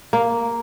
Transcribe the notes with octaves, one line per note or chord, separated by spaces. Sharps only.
A#3